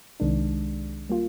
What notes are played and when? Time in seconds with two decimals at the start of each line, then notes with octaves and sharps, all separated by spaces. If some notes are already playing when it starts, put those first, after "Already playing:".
0.20 C2 C3 D#3 G#3 D4
1.10 G3 A#3 F4